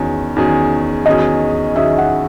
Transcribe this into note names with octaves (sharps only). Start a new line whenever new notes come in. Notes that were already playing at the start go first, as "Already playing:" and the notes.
Already playing: E2 D#3 F#3 C#4 G#4
E2 D#3 F#3 C#4 G#4
E2 D#3 F#3 C#4 G#4 D#5
E2 D#3 F#3 C#4 G#4 E5
F#5